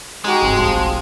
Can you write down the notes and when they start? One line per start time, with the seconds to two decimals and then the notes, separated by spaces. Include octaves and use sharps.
0.24 G#3 D#4 F#4 G4
0.42 G1 C4
0.57 F#1 B1 F3